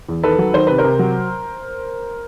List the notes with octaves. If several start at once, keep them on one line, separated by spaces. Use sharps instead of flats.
E2
D#3 A4 B4
F#3
D#3 C5
C3 B4
A#4 C5
C3
F#3